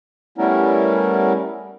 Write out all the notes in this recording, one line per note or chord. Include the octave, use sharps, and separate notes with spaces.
G3 A3 B3 C#4 E4 A#4